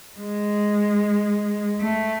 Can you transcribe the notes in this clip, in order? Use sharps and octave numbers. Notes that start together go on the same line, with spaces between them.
G#3
A3